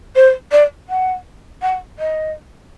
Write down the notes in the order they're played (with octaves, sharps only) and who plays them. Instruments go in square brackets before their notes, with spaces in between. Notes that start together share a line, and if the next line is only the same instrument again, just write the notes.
[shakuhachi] C5
D5
F#5
F#5
D#5